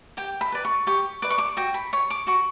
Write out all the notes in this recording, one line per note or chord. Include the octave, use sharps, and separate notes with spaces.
G4 G5
B5
B4 D5
C#6
G4 C#6
B4 D5 D6
C#6
D6
F#4 G5
B5
C#5 C#6
D6
F#4 C#6